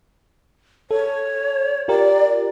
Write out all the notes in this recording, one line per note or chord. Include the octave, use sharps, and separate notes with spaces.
A4 C#5
F4 G4 A#4 D5